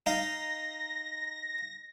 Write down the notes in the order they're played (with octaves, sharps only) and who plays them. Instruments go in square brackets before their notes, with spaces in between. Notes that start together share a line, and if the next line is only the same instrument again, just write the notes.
[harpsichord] D#4 F5 [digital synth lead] A#6